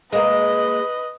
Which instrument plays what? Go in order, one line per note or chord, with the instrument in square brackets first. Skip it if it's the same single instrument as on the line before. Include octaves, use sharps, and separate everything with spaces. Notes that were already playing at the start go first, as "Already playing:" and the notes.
[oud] G#3 A#3 [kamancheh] B4 D#5